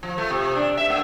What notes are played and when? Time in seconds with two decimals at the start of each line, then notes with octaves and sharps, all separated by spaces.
0.03 F3
0.18 A3
0.30 C3
0.55 D4
0.77 E5
0.90 A3